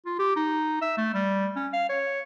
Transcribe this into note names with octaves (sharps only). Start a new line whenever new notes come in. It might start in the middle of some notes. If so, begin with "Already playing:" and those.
F4
G4
D#4
E5
A3
G3
C#4
F5
C#5